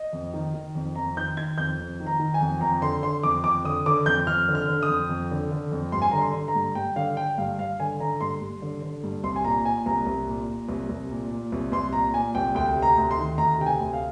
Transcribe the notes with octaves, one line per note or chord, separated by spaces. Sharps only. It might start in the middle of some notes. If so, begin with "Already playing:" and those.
Already playing: D#5
F2
D#3
D#3
F2
F2 A#5
D#3 G6
D#3 G#6
F2 G6
F2
D#3
A#5
D#3
G#5
F2
F2 A#5
D3 C6
D3 C6
F2 D6
F2 D6
D3 D#6
D3 D6
F2 G6
F2 F6
D3
F6
D3
D#6
F2
F2
D3
D3
F2
G2 C6
G#5
D3 A#5
C6
D3
A#5
G2
G2 G5
D3 F5
D3 G5
G2 F5
G2 F5
D3 G#5
D3 A#5
G2 C6
G2
D3
D3
G2
C2 C6
G#5
A#2 A#5
A#2 G#5
C2 A#5
C2
A#2
A#2
C2
C2
A#2
A#2
C2
C2 C6
A#2 A#5
A#2 G#5
C2 G5
D2 G5
C3
A#5
D2
C6
D#3
D2 A#5
C3 G5
G#5
D2
F5